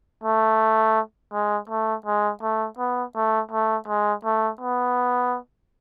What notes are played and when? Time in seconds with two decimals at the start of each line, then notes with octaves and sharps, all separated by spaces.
0.24 A3
1.33 G#3
1.69 A3
2.06 G#3
2.42 A3
2.79 B3
3.15 A3
3.51 A3
3.88 G#3
4.24 A3
4.61 B3